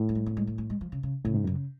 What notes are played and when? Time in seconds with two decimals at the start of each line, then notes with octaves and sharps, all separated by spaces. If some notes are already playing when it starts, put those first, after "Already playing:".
Already playing: A2
0.09 A3
0.15 G#3
0.26 B3
0.37 G#3
0.47 A3
0.58 A3
0.70 G#3
0.81 F3
0.92 C#3
1.03 C#3
1.25 A2 C#3
1.34 G#2
1.44 F#2 C#3